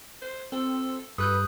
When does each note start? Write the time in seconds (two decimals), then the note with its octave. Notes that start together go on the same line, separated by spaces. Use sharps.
0.22 C5
0.52 C4 A4
1.18 G2 A4 B4 D#6 F#6 G6